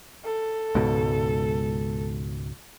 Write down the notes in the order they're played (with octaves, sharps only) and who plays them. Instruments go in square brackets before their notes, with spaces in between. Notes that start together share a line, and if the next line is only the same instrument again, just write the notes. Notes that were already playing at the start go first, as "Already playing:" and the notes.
[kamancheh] A4
[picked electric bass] C#2 G#2 B2